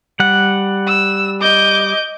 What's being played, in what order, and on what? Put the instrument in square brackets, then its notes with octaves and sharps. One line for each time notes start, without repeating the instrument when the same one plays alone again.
[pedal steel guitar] G3 F#5
[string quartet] E6
D#5 D6 G6